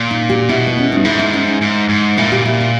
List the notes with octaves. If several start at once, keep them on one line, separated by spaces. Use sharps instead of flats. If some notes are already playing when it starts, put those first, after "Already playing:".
Already playing: A#2
D#4
G4
B2 E4
B3
C#4
G2 D#4
G#2 E4
D#4
C#4
D#4
G#2 D#4
G#2
A#2 E4
G4
E4
E4